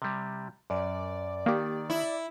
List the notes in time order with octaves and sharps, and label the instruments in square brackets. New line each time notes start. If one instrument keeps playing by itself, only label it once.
[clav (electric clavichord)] C3 G3
[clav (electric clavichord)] F#2 [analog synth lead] D5
[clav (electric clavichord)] D#3 [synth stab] A#3 G4
[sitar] E4